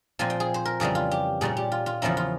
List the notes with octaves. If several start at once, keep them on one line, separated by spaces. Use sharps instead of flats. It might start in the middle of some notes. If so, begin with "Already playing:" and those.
A#2 F3 C4 G#5
G5
G#4
C5
A#4
F2 C#3 E3 G3 G#4
F4
G4
A#2 G3 C#4 G#4
G4
F4
F4
E2 C#3 F3 A#3 C#4 E4
F4